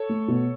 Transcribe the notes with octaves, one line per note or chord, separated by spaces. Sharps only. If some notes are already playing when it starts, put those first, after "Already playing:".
Already playing: A4 C#5
A3
B2